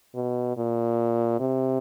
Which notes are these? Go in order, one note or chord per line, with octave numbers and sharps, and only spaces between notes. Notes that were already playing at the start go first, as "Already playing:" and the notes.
B2
A#2
C3